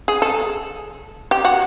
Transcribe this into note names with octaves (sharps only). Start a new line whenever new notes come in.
G#4
A4
G4
F#4